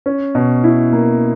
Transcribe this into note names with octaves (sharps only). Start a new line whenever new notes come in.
C#4
B2
E4
A#3